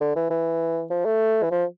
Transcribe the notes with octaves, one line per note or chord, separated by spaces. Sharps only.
D3
E3
E3
F3
A3
E3
F3